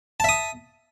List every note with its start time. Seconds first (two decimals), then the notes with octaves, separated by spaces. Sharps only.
0.20 A5
0.24 E5
0.29 D#6